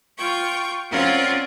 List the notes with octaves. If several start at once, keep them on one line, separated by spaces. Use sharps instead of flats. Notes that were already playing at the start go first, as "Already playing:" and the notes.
F4 G5 C#6
C4 C#4 F4 A#4 D5 F#5